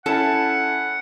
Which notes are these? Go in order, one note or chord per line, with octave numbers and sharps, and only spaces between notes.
C#4 E4 A4 F#5 A5